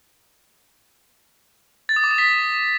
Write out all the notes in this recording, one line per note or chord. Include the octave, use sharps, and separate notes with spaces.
A6
D#6
D6
D#6
B6